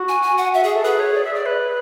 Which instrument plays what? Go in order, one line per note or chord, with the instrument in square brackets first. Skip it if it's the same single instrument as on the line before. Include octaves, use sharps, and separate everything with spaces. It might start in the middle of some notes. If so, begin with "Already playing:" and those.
Already playing: [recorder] F#4
[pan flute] G#5
G#5
F#5
E5
G#4
[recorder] A4
[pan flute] G#4 [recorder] B4
[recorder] C#5
D5
E5
D5
B4